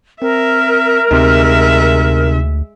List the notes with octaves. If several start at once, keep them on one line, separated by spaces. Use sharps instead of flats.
C4 A#4 E5
D2 C3 G#3 D#4 E5